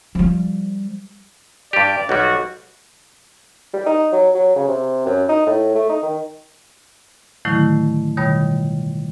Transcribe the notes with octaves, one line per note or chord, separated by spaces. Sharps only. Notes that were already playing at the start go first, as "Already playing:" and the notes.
F3 G3
G2 G4 D5
B1 G3 F#4
G3
D#4
F#3
F#3
C#3
C3
F#2
D#4
A2
A3
D#4
D#3
A2 D3 D#3 F#3 A3 E4
F2 B2 D#3 G3 C#5 B5